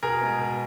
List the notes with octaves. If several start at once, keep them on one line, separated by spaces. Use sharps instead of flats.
B2 G#4 A#4
G#3 B3
B2